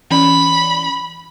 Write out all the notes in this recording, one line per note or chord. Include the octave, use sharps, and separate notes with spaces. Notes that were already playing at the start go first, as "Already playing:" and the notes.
E3 C#4 D5 B5